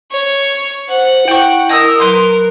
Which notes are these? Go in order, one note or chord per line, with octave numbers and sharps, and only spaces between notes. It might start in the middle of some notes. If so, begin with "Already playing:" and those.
C#5
C5 F#5
E4 G5 C#6
A#4 D#5 D#6 E6
F#3 B4 C6